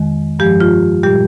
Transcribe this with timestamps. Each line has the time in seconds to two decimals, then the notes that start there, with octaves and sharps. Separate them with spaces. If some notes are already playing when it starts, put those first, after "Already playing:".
Already playing: F2 D#3 G#3
0.39 G2 F3 G#3 G4
0.60 F4
1.03 A#2 G3 G4